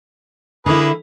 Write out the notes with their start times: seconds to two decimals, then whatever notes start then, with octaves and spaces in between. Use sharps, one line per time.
0.66 D3 A#3 E4 G#4 B4